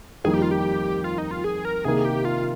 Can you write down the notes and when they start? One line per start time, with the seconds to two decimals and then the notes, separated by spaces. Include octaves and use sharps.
0.24 F2 D#3 G3 A#3 G#4
0.34 G4
0.42 F4
0.51 G4
1.04 F4
1.18 D#4
1.31 F4
1.44 G#4
1.65 A#4
1.85 C3 D#3 A#3 G#4
2.04 G4
2.25 F4